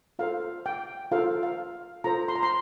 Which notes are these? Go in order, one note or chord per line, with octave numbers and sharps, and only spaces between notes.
F4 A4 C5 F5
G5
F4 A4 C5 F5
F5
F4 A4 C5 A#5
C6
A#5
C6